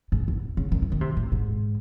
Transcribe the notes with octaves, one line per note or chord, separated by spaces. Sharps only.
G#2
E2
C#3
D#3
E3
D#3
C3
A2
G#2